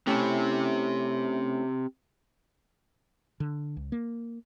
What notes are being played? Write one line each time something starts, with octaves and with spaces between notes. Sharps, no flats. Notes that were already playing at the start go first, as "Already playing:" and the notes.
A3 C4 C#4 E4 G4 G5
D3
C#2
A#3